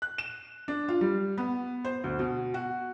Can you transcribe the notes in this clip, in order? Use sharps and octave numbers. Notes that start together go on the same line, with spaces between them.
F#6
E7
D4
F4
G3
B3
C5
D2
B2
F#4